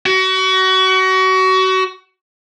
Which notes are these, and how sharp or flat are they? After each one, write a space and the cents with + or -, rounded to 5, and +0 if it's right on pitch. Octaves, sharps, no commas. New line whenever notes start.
F#4 +30